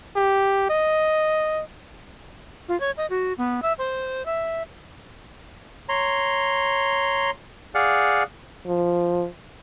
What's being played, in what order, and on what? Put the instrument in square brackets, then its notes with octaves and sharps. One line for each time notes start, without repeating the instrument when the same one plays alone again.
[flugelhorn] G4
D#5
[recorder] F4
C#5
D#5
F#4
B3
E5
C5
E5
[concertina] C#5 A#5 C6
G#4 D5 F5 F#5
[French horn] F3